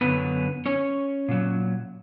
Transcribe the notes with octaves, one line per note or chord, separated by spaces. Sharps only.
F#2 D3 F#3 B3 B4
C#4 C#5
A#2 F#3